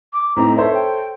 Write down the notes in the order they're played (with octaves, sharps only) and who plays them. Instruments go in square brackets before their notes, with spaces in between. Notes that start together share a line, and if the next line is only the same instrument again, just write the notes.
[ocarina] D6
[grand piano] A2 C4 D#4 [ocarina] A#5
[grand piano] A4 C5 C#5 [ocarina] E5
[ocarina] G5